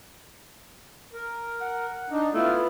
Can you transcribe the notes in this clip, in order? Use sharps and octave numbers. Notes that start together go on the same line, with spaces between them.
A#4
F#5
D4 D#4
A3 B3 E4 F4